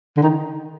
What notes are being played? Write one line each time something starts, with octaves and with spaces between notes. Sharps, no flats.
D3
D#3